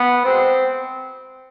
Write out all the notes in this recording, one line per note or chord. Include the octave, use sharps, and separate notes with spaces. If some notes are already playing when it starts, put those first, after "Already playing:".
Already playing: B3
B2 G#3 C4